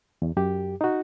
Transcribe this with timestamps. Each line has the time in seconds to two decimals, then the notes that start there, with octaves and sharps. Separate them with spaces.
0.22 E2
0.37 F#2 G4
0.81 D#4 F#4